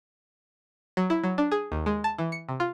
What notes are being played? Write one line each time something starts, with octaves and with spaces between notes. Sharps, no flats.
F#3
E4
F#3
D4
G#4
D#2
G#3
A5
E3
C#7
C3
F4